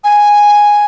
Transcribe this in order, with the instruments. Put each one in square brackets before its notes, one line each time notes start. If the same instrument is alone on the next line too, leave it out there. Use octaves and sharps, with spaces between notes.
[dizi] G#5